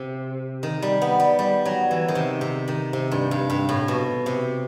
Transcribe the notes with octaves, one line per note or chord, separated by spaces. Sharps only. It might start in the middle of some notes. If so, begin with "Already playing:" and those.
Already playing: C3
D#3
G3
B3
G3
G3
F#3
E3
D#3
C3
C3
D#3
C3
G2
G2
G2
A2
B2
C3